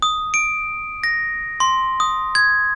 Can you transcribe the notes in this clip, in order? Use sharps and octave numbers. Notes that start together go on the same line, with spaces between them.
D#6
D7
A#6
C6
D#6
G#6